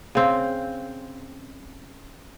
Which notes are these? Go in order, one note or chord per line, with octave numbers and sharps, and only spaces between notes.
C#3 C4